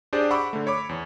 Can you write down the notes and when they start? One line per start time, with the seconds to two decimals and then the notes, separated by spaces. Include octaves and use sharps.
0.13 D4 G4 G#4 C5 D5
0.31 F#5 B5 C#6 D6 E6
0.53 D3 A3
0.67 C#5 B5 D6
0.89 E2